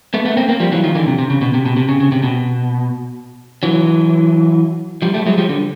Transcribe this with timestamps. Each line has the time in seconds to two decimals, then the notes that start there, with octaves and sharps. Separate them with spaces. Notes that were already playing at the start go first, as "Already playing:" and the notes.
0.14 A3 B3
0.25 A3 B3
0.37 A#3 C4
0.48 A#3 C4
0.60 F3 G3
0.72 E3 F#3
0.84 D#3 F3
0.95 D3 E3
1.07 C3
1.18 C3
1.30 C#3
1.41 B2
1.54 C3
1.66 B2
1.76 C3
1.89 C#3
2.00 C#3
2.12 C3
2.23 B2
3.63 E3 F#3
5.02 F3 G3
5.14 G3 A3
5.26 F#3 G#3
5.38 F3 G3
5.49 D3